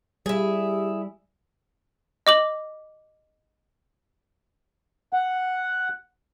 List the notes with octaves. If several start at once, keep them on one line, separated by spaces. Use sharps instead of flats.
G3 E4 G4 G#4
D#5 D6 F#7
F#5